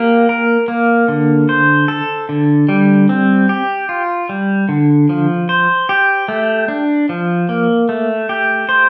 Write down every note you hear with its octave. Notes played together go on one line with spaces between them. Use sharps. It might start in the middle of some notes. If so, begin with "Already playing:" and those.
Already playing: A#3 G4
A#4
A#3
D3
C5
A4
D3
G3
C4
G4
F4
G3
D3
F3
C5
G4
A3
D4
F3
A#3
A3
G4
C5